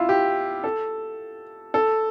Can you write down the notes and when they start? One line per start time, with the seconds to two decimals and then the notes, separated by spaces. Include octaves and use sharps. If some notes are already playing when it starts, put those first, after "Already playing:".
Already playing: E4 F4
0.09 G4
0.64 A4
1.74 A4